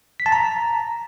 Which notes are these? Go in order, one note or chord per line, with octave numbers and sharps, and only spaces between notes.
B6
A5
A#5